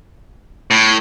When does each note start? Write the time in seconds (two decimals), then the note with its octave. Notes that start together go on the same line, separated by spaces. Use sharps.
0.71 A2